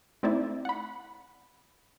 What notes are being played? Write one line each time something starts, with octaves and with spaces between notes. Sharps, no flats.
A3 C4 D#4 E4 D5 E5
F#5 B5